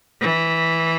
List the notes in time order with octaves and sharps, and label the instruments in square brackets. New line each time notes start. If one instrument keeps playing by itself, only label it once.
[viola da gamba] E3